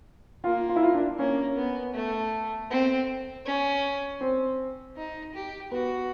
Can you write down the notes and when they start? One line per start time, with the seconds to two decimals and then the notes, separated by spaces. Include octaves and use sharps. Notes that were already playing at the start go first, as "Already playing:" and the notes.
0.44 A#3 F4
0.69 F4
0.76 E4
0.83 F4
0.94 D4
1.19 A#3 C#4
1.56 B3
1.94 A3
2.70 C4
3.45 C#4
4.21 C4
4.96 D#4
5.34 G4
5.71 B3 F#4